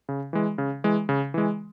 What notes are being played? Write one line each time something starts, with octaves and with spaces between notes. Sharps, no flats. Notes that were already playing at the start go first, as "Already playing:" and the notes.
C#3
E3 G#3
C#3
E3 G#3
C#3
E3 G#3